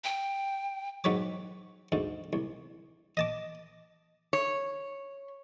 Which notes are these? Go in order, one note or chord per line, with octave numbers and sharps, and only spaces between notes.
G5
G#2 F#3 B4 C#5 D6
D2 G#2
C2
D#5 A5 D6
C#5